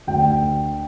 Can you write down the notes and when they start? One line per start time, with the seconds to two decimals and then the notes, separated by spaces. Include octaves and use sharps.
0.07 D2 G5